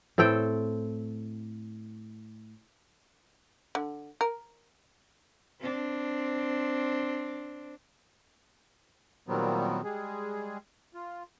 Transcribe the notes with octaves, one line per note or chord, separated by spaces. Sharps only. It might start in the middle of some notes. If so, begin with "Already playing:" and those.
A2 C4 A4 G5
D3
A#4
C4 D4
A#2 D#3 F#3 G3 B3 C4
G3 G#3 G#4
F4